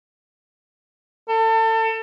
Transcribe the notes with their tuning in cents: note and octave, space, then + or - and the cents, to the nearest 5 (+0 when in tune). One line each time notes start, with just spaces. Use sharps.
A4 +30